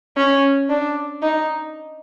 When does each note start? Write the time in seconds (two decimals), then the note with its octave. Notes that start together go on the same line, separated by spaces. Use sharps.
0.17 C#4
0.69 D4
1.22 D#4